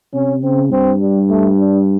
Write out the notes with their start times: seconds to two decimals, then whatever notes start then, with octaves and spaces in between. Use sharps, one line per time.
0.14 C3 C#4
0.43 C#3 C4
0.72 G2 C4
1.01 G3
1.30 A3
1.59 D4